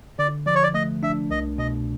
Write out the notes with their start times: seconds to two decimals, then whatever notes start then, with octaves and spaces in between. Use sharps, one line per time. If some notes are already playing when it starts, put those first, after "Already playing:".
0.19 D3 D5
0.46 F3 D5
0.55 C#5
0.63 D5
0.74 A3 D#5
1.03 D4 E5
1.31 C2 D#5
1.58 B2 D#5